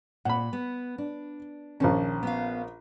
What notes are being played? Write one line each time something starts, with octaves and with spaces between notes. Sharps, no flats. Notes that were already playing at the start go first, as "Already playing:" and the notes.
A#2 F#5 B5
B3
D4
A#1 D#3 C#4 A5
B3 F5